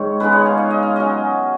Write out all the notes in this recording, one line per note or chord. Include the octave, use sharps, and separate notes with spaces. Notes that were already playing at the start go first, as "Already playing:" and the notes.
Already playing: G#2 D#3 C#5 F5
C#3 G#3 B3 D#4 B4
C#5
F5
D#5
D#5
F5
F#3 C#4 D#5